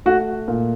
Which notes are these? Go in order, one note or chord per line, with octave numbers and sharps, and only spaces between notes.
A3 F#4
A#2